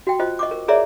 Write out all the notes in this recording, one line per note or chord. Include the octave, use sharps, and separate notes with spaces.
F#4 G5
F4 C5 D#5
D#5 C#6 D6
A#4
G#4 A#4 C#5 D5 E5 A#5